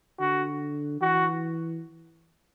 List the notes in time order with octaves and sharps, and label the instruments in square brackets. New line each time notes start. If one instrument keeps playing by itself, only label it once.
[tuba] D3 [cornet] F#4
[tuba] E3 [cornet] F#4